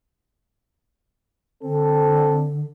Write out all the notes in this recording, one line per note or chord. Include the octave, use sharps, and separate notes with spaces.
D3 C4 A4